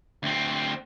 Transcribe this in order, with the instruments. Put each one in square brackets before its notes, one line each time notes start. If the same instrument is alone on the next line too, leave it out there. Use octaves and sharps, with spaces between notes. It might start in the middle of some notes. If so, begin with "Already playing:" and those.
[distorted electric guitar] D2 C4